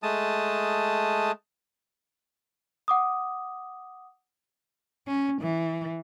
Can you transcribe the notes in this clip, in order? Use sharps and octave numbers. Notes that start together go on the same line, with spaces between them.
G#3 A3 A5 D#6
F#5 D6 D#6
C#4
E3